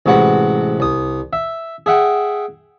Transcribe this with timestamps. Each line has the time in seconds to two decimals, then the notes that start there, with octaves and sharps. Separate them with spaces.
0.06 A1 C3 G#3 F#4 B4 F#5
0.80 C2 D#6
1.33 E5
1.86 G#4 E5 F#5 G5